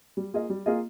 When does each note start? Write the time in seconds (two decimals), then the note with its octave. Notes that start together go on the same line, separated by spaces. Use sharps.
0.17 G3
0.34 A#3 F4 G#4 D#5
0.50 G3
0.66 A#3 F4 G#4 D#5